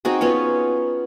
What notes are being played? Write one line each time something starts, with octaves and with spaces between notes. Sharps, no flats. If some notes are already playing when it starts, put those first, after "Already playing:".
C4 D#4 F#4 G#4
B3 C#4 F4 C#5